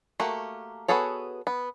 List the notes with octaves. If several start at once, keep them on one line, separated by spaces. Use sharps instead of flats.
A3 A#3 F#4 G4
B3 F#4 G#4 A4 C#5
B3